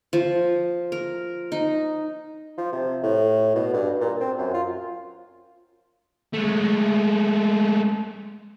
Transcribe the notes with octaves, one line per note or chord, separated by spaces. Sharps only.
F3
A#4
D#4
F3
C3
A2
B2
G2
A#2
C4
F#2
F4
G#3 A3